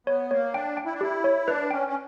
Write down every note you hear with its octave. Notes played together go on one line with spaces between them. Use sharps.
B3 C#5
A#3 C#5
D4 G5
G5
E4
D4
E4 G4
C#5
D4 B4
C#4 G5
C#4